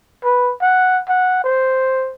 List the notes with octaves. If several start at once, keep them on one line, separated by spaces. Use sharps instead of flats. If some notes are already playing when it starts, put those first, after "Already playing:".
B4
F#5
F#5
C5